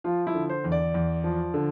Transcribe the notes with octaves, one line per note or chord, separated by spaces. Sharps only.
F3 F4
E4
D3
C5
E2
D5
E2
F3
D3